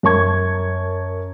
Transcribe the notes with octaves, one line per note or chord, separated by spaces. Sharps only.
F#2 A#4 A5 C#6 G#6